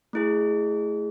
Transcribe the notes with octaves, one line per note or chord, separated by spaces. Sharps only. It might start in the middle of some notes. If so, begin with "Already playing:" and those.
A3 E4 G#4